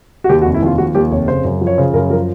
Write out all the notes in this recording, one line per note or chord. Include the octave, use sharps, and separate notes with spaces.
F#4
D#2 G4
F#4
F1
E4
D#2 F4
F3 F#4
D#2 G4
F1 C#5
C#3 C5
F#2
F3
C#5
C#3 C5
F#2 A#4
F3 A#4